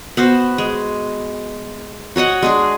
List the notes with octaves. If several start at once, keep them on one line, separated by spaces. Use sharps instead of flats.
B3 F#4 C5
G#3
F#4 C#5 D#5 F#5
G#3 D4 G#4